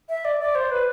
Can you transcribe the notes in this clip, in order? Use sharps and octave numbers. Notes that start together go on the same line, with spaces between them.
E5
D5
D5
C5
B4